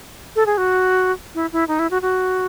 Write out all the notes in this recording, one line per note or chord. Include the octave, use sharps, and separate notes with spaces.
A4
G#4
F#4
E4
E4
D#4
E4
F#4
F#4